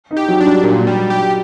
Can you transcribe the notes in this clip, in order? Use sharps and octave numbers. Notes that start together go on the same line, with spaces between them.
D#4
G4
F#3
D4
G3
A#2
G3
G4